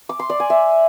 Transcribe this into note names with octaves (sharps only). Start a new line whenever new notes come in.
D6
C6
D5
G#5
E5